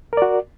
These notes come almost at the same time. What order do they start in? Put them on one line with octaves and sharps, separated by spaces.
A#4 D5 F#4